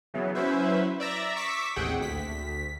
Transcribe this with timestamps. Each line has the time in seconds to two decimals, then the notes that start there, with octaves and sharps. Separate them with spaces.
0.14 C#3 E3 F#3 B3
0.35 F#3 C#4 E4 B4 C5 E5
1.00 D5 E5 A#5
1.36 C#6 D6 E6 B6
1.76 A1 D#2 C3 G#4 F#5 G5
1.99 D2 B6